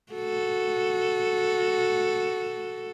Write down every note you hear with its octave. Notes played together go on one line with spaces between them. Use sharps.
F#4 A4